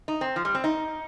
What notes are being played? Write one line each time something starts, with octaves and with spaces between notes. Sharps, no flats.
D#4
C4
F3
G3
C4
D#4